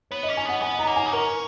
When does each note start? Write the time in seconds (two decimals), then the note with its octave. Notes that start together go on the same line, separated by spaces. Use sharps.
0.11 B3 C#5
0.23 D#5
0.29 C#4
0.37 G#5
0.45 B3 F#5
0.62 B3 G#5
0.79 A#5
0.87 A#3
0.96 G#5
1.06 D#4
1.12 C#4 A#4